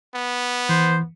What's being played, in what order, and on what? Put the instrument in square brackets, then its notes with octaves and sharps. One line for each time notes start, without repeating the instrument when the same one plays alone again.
[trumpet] B3
[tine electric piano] E3 [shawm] C5